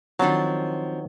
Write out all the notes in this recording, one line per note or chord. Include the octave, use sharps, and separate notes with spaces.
D#3 F3 F#3 C4 D4 A5